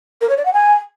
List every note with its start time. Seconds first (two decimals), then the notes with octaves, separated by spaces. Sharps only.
0.21 A#4
0.29 C#5
0.37 D5
0.45 F#5
0.53 G#5